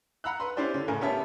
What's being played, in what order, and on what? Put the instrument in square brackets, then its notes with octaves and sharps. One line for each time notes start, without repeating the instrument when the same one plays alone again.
[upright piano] F#5 A#5 B5 E6 F#6
B4 C6
C#4 E4 G4 C5 D5
D3 C#4
A2 C#3 A#4 G#5
B3 C#4 G4 C#5 E5 A5